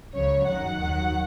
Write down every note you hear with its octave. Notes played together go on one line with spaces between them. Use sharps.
C#2 C#3 F#3 C#5
F#2 D#3 F#3 F#5
D#2 D#3 F#3